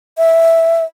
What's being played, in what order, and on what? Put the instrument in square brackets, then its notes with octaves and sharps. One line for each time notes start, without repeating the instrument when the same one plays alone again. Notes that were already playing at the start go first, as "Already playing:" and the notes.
[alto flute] E5